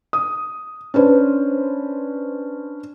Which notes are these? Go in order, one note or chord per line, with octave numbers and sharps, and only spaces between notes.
D#6
C#4 D4 B4 C5